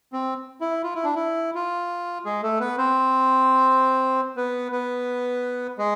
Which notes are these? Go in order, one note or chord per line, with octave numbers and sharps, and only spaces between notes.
C4
E4
F4
E4
D4
E4
F4
G#3 G#4
A3 A4
B3 B4
C4 C5
B3 B4
B3 B4
G#3 G#4